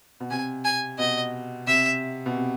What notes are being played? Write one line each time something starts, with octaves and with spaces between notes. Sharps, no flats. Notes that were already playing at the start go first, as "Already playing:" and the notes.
B2
C3 G#5
G#5
B2 D#5
C3 E5
B2
C3